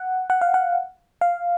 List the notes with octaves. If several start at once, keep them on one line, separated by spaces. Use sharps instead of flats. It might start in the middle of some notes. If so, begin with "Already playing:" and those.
Already playing: F#5
F#5
F5
F#5
F5